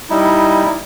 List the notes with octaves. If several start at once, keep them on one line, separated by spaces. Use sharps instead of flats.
G3 D#4 E4